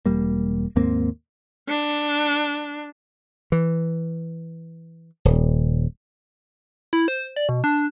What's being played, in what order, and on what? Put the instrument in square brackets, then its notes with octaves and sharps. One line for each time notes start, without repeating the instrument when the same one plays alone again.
[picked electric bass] E1 G3 A#3
D#2 G#2 A#3 C4
[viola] D4
[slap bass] E3
D#1
[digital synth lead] E4
C5
D5
B2
D4